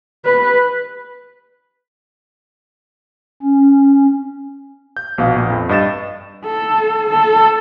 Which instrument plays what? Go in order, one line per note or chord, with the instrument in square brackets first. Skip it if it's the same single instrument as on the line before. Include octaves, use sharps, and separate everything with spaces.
[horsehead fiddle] B4
[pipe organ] C#4
[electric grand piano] G6
A#1 B2 F5
A#1
F2
G2 D#5 A6 E7
[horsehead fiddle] A4
A4